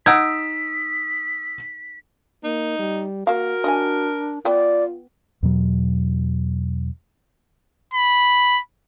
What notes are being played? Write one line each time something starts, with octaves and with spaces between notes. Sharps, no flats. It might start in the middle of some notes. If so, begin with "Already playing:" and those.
D#4 F#5 D#6 E6 F#6 G#6 B6 D7
A#3 D#4
G3
A#3 F#4 A#4 F5
D4 D#5 F#5 G#5
B3 F4 D5 G5
E2 B2 F#3
B5